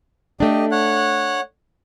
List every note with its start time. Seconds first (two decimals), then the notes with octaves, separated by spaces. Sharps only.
0.40 A3 D4 G4 D#5
0.72 C#5 F#5 F#6